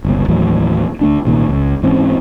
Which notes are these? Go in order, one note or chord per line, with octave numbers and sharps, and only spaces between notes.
G1 C#2 B2
D#2 A2 E3 F#3
D2 A3 D4
C2 A#2 D#3
C#2
G#2 E3 C4 C#4